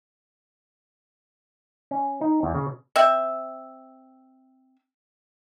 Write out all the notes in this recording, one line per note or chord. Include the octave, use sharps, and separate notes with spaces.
C#4
D#4
E2
C#3
C4 E5